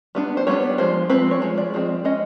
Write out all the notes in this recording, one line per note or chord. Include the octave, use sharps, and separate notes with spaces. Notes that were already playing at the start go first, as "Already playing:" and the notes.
G3 B3 D4
C5
G3 B3 D4 C#5
F3 G#3 C5
F3 G#3 C4 B4
C#5
F3 G#3
D5
F3 G#3 C4
G#3 C#4 D#5